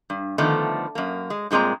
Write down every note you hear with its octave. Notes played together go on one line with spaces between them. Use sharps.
G2
D3 D#3 F3 A3 B3 A4
F#2 A#3
G#3
G2 A#2 G#3 C4 A#5